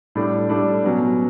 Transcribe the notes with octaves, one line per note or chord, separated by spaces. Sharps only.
A2 G3 D4 A4
A2 G3 D4 A4
B2 F#3 C#4